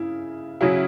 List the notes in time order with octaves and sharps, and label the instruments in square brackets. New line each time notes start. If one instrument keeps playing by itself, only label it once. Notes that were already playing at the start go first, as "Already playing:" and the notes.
Already playing: [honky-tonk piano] C#3 [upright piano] E4
[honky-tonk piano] C#3 F#3 C#4 E4 [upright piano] F#4